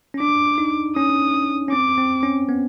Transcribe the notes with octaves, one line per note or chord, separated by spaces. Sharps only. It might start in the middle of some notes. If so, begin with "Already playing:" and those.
C#4
D4 D6
D#4
C#4 D#6
C#4
C4 D6
C4
C#4
B3